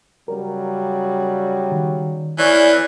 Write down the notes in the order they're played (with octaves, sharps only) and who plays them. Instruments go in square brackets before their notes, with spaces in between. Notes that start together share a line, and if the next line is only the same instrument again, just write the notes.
[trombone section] C#3 F#3 G3 [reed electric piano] A#4
[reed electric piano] D#3
[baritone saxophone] E3 [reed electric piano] C#5 G#5 C#6 [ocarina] D5